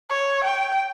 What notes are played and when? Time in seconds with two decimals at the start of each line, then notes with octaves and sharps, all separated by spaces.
0.10 C#5
0.44 G5